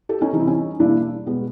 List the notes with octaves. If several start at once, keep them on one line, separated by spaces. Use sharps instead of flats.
G4 A4
C#4 D#4
C3 E3 G3 C4 D#4
E4
C#4 D#4
E2 B2 G3 A#3 D4 E4
B2 G#3 B3